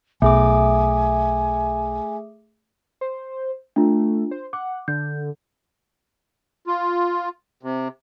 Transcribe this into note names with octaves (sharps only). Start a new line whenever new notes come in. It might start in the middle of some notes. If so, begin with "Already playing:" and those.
B1 A3 G#4 G#5 D6
C5
A3 D4 F4
C5
F#5 D6
D3 G6
F4
C3